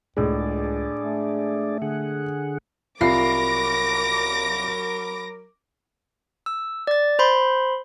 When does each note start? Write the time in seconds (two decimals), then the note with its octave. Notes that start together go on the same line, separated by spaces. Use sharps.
0.17 C#2 A2 G#3 D4 G#4 D5
1.01 A3
1.82 D3 G#4 F#5
3.01 C2 F#3 F4 A#4 B5 D6 A#6 C7
6.46 E6
6.87 D5 A6
7.19 C5 B5 C6